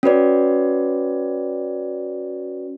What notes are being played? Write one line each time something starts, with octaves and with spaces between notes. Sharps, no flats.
C#4 F#4 B4 D5